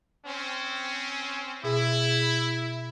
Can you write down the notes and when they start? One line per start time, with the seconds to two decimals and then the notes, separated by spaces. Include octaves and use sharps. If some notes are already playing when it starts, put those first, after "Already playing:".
0.26 C4 C#4
1.64 B2 E4 G#4